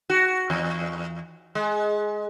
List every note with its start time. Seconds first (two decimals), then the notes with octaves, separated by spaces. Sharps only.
0.10 F#4
0.50 E2
1.55 G#3